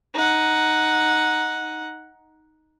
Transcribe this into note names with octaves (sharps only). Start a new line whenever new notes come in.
D#4 F#5